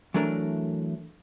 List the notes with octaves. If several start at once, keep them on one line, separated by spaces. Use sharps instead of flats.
E3 F#3 A3 D4 A#4